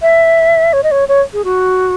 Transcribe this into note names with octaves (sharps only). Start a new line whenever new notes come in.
E5
C#5
D#5
C#5
C#5
G#4
F#4